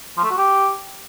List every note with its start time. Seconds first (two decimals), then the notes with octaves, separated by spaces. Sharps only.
0.17 F3
0.24 A3
0.31 F#4
0.38 G4